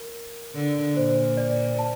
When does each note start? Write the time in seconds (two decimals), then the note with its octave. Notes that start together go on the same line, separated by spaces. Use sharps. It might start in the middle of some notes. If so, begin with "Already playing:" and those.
Already playing: A#4
0.55 D3
0.96 A#2 C5
1.37 D5
1.79 A5